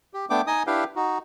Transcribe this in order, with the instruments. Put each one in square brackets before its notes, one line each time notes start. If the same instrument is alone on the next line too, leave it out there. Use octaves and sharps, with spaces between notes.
[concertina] G4
A3 B3 D4 G5 D6
D#4 D#5 G#5 D#6
D4 E4 G4 B4 F5 G5
D#4 F#4